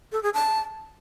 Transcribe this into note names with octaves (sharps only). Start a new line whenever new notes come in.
A4
G#4
A5